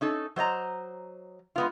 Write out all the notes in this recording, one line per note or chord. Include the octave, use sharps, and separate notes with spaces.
C#4 D#4 A4
F#3 C5 D#5 A#5
G#3 B3 F4